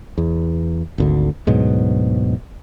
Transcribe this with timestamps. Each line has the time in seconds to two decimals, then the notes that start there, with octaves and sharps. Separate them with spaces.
0.18 E2
0.98 G#1 D2 D3
1.47 D2 G#2 B2 F#3